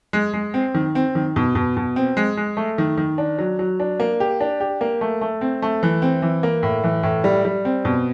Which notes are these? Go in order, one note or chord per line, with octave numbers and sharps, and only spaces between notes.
G#3
G#3
C4
D#3
C4
D#3
B2
B2
B2
C4
G#3
G#3
A3
D#3
D#3
D4
F#3
F#3
D4
A#3
G4
D4
G4
A#3
A3
A3
C4
A3
E3
C4
E3
A#3
A2
E3
A2
G3
G3
C4
B2